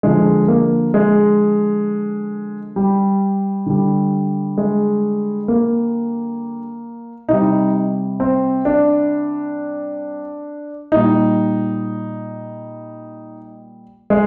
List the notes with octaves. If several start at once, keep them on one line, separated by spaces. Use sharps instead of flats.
D3 F3 G#3
A#3
G#3
G3
D3 G3
G#3
A#3
C3 G3 D#4
C4
D4
A#2 G3 D#4
G#3